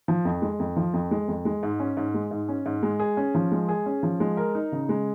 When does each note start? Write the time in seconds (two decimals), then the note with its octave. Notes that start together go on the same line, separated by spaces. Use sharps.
0.08 F3
0.25 F2
0.42 G#3
0.60 F2
0.77 F3
0.93 F2
1.11 G#3
1.28 F2
1.45 G#3
1.63 G#2
1.80 C#4
1.97 G#2
2.14 G#3
2.31 G#2
2.49 C#4
2.66 G#2
2.83 G#3
2.99 G#4
3.17 C#4
3.35 F3
3.52 G#3
3.69 G#4
3.86 C#4
4.03 F3
4.20 G#3
4.37 A#4
4.55 D#4
4.72 C#3
4.89 G#3